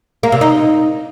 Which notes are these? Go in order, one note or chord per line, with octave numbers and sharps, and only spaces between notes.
A#3
C3
D#4